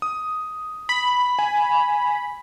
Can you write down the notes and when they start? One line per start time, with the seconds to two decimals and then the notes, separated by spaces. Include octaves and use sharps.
0.02 D#6
0.89 B5
1.39 G#5